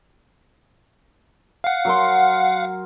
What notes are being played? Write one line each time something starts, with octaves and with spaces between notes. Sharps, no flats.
F5 F#5
F#3 A#4 C6